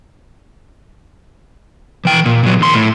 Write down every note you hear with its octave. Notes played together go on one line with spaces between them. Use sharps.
E3 G5
A#2
A#2 F#3
D#2 C6
A2